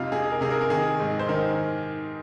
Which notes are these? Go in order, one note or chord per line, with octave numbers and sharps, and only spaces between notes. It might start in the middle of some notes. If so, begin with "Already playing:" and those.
Already playing: F2 C3 D#4 F4
C3 G#4
A#4
C3 G#4
A#4
A#4
D#3 G#4
G#2
C5
D#3 A#4